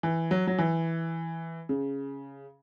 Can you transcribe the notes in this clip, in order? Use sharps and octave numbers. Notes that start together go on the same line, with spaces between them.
E3
F#3
F#3
E3
C#3